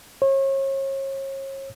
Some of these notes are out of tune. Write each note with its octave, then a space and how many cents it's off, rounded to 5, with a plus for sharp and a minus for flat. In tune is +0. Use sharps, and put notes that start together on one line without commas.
C#5 -35